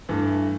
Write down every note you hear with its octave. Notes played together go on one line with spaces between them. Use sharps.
G2 E3 A3